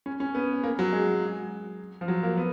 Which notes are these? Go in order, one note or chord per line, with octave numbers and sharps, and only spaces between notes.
C#4
C#4
B3
A#3
F#3
G#3
F3
F#3
A#3
B3